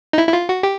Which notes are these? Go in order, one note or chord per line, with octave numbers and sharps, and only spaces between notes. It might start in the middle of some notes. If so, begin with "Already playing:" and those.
D#4
E4
E4
F4
F#4
G4